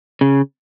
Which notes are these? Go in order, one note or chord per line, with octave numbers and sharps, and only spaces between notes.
C#3